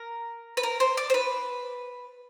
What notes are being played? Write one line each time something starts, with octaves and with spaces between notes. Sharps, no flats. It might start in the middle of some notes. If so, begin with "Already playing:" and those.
Already playing: A#4
B4
A#4
C5
D5
C5
B4